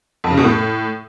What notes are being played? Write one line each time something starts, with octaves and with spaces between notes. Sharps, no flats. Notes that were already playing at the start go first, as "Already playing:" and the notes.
F2
C#3
B2
A2